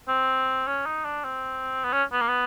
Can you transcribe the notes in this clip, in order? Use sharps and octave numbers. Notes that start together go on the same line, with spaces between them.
C4
C#4
D#4
D4
C4
B3
C#4
B3
A#3
B3